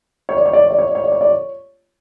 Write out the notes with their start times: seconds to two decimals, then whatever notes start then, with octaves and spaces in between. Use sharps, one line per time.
0.29 C#5
0.37 D5
0.46 C#5
0.53 D5
0.62 C#5
0.71 D5
0.79 C#5
0.87 D5
0.95 C#5
1.04 D5
1.12 C#5
1.21 D5
1.29 C#5